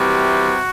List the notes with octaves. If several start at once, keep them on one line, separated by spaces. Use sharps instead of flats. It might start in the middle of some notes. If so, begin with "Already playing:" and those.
Already playing: C3 E3 G3 F#4